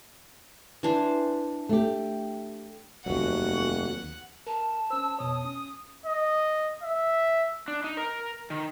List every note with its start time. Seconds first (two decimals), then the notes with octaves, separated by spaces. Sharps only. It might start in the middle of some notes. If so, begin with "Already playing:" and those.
0.83 E3 D4 C5
1.69 A3 G4
3.06 F1 D#2 F#3 F#4 F#5
4.47 A#4 A5
4.90 C#4 C5 E6
5.19 F2 B2 C#5 D#6
5.45 C#4
6.06 D#5
6.83 E5
7.68 D4
7.84 D#4
7.97 A#4
8.50 D#3